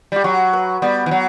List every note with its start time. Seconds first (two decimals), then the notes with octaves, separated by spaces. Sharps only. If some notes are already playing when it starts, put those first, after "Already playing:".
0.12 G3 G4
0.24 F#3 F#4
0.53 B4
0.82 G3 B3
1.06 E3
1.11 F#3